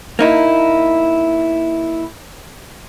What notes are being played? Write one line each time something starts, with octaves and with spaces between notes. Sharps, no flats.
A#3 D#4 E4